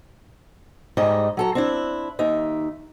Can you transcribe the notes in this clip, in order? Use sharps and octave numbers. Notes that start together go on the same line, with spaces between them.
G#2 G3 D#5 A#5
F#3 A4 A#5
C4 D4 E4
D#2 D#4 E5